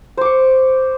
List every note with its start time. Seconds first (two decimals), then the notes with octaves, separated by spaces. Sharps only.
0.17 C5
0.21 D6
0.25 C#6